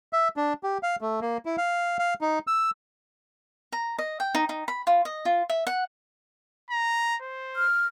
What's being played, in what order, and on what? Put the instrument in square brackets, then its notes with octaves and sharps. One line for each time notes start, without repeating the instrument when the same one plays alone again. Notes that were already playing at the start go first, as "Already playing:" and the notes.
[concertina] E5
D4
G4
F5
A3
A#3
E4
F5
F5
D#4
E6
[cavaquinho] A#5
D#5
G5
D#4
D#4
B5
F4
D#5
F4
E5
F#5
[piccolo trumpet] A#5
C5
[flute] F6